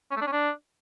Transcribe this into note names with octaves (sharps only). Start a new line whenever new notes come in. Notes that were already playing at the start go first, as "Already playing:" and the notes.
C#4
A3
D4
C#4
D4